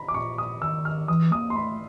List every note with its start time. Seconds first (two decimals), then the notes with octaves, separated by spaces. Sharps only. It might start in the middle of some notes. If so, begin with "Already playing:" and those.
Already playing: A#5 B5
0.08 D6
0.14 A#2 C#6
0.38 D#6
0.61 D#3 E6
0.85 F6
1.08 E3 D#6
1.31 A#3 D#6
1.50 C6
1.55 A3 B5